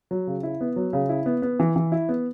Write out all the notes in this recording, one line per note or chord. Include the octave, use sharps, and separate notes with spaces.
F#3
C#3
E4
B3
F#3
C#3
E4
B3
B3
E3
E3
E4
B3